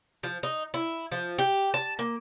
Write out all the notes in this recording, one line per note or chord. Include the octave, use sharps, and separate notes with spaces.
F3
D#4
E4
F3
G4
A5
A#3